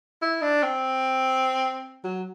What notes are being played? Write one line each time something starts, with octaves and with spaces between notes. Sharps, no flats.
E4
D4
C4
F#3